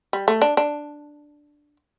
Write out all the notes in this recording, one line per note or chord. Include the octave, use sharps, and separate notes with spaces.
G3
A3
D4
D4